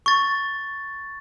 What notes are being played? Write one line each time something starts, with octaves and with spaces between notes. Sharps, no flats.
C#6 A6